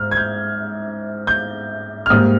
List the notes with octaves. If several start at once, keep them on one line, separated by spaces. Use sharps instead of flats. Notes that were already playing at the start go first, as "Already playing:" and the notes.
Already playing: G#2 F6
G#6
G6
G6
F6
G#2 G3 A#3 D#6